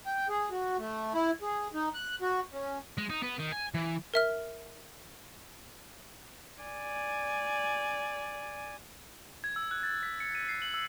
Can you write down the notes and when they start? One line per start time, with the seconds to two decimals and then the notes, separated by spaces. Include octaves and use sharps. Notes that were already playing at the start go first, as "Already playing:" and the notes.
0.06 G5
0.29 G#4
0.51 F#4
0.78 A3
1.14 E4
1.42 G#4
1.74 D#4
1.94 F#6
2.21 F#4
2.53 C#4
2.98 G#3
3.10 D#4
3.23 B3
3.39 D#3
3.52 G#5
3.74 E3
4.14 A#4 E5 F6
6.63 D5 G#5
9.44 G#6
9.56 E6
9.71 F#6
9.83 A6
10.03 B6
10.20 C#7
10.35 D#7
10.49 C7
10.62 F#7
10.74 E6